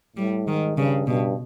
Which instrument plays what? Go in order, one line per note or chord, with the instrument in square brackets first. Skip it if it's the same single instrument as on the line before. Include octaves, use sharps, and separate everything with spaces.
[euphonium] A2 [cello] G3
[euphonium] G#2 [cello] D#3
[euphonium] G2 [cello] C#3
[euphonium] G2 [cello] B2